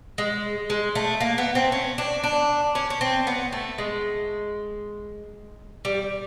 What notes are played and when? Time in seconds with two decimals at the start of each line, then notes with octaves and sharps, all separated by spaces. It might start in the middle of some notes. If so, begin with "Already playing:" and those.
0.18 G#3
0.70 G#3
0.95 A3
1.21 A#3
1.38 B3
1.55 C4
1.72 C#4
1.98 D4
2.24 D4
2.75 C#4
2.90 C#4
3.01 C4
3.27 B3
3.53 A3
3.78 G#3
5.85 G3